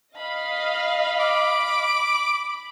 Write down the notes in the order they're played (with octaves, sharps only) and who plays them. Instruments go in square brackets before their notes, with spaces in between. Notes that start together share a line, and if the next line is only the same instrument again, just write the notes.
[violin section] D#5 F5 [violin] B5
[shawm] D6